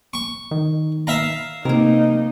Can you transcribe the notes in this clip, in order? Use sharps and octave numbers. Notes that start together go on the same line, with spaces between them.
C#6
D#3
E5 F5 A#5
C3 A#3 D#4 A#4